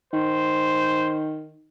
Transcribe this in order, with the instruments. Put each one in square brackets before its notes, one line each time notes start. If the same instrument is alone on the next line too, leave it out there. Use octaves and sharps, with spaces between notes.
[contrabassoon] D#3 [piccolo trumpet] C5